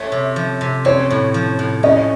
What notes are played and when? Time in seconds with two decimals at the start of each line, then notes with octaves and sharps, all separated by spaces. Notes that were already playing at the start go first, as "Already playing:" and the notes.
Already playing: A3 C#5
0.12 C3
0.36 F3
0.61 C3
0.85 C4 C#5
1.10 A2
1.34 F3
1.59 A2
1.83 C#4 D#5